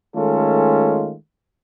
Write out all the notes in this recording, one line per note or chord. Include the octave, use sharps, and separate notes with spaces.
D#3 G#3 A3 C#4 F4 A4